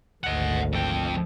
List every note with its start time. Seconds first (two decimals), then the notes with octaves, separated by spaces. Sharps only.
0.24 G#1 D2 D#5 F#5
0.73 F2 G5